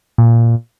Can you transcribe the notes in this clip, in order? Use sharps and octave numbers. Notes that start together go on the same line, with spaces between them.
A#2